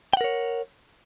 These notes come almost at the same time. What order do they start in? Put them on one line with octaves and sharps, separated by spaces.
G5 F#5 A#4 C#5